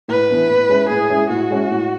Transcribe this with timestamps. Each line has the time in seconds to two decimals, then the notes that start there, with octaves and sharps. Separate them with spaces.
0.08 A2 B4
0.29 E3 B3 D4
0.49 A2
0.69 G#3 C#4 E4
0.89 A2 G#4
1.10 G#3 C#4 E4
1.30 A2 F#4
1.50 G#3 C#4 E4
1.71 A2